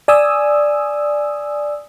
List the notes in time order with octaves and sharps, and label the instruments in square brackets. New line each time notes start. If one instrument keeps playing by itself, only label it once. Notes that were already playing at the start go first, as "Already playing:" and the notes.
[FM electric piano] D5 G#5 D#6 E6